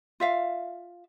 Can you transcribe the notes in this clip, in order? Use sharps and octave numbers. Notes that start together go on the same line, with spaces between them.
F4 E5 F5